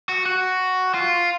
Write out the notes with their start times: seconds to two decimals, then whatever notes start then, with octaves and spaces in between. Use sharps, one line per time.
0.09 F#4
0.26 F#4
0.94 F4